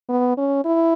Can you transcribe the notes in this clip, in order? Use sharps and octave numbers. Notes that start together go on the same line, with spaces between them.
B3
C#4
E4